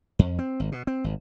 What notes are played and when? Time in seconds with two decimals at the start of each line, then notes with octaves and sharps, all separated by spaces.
0.19 F2
0.39 C4
0.60 G#1
0.72 B2
0.87 C4
1.04 G#1